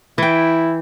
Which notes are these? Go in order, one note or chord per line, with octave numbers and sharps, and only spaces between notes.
E3 E4 G5